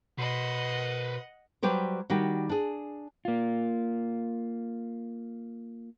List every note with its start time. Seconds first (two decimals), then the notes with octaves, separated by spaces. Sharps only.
0.18 B2 B4 C5 D#5 F#5
1.63 F#3 G3 G4 B4 C5
2.10 D#3 G3 F#4 G4
2.49 D4 G#4
3.25 A#3 F4